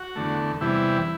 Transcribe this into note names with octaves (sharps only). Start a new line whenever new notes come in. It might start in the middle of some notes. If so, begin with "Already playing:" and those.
Already playing: F#4
E2 D3 A3
E2 C3 E3 G3 E4